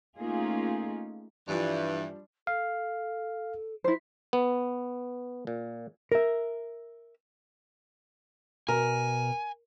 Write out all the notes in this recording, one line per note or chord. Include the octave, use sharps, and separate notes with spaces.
A3 A#3 C#4 D#4 F4 G#4
G2 E3 F3 G3 D4
A4 F5
E4 F4 C5
B3
A#2
A#4 E5
B2 A#4 G#5